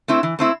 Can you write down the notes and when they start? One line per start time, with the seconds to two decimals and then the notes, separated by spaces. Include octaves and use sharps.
0.08 A3 C4 E4
0.23 E3
0.39 A3 C4 E4